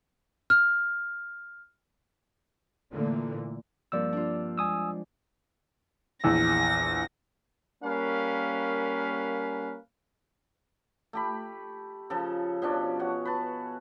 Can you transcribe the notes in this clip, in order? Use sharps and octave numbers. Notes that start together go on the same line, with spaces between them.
F6
A#2 D3 E3 A3 A#3
G2 F3 A#3 C4 D5 E6
D4 F4
G#3 G#5 D#6 E6
A#1 E2 E6 A#6
G3 A#3 C#4 A#4 B4 F5
A3 G4 B5
C#3 F3 A4 A#5
B2 F3 C#4 D4
F#4 C#5
B4 A5